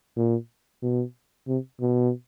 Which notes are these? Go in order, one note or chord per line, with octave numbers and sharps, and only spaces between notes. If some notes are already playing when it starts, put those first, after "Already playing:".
A#2
B2
C3
B2